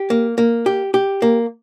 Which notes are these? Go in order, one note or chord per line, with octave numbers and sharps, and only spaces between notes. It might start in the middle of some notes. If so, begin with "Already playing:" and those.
Already playing: G4
A#3
A#3
G4
G4
A#3